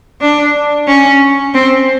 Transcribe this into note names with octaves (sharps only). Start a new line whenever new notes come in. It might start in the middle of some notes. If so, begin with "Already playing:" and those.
D4
C#4
C4